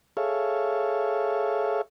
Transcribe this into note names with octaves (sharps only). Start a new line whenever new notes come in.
G#4 A4 C#5 E5 F5